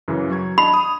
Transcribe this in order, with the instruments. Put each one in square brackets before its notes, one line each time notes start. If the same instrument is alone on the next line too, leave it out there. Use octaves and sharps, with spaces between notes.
[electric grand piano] F#2 C#3 E3
F#3 C#6 G#6
[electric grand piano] D4 D#5 A5 [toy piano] B5
[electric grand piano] D#6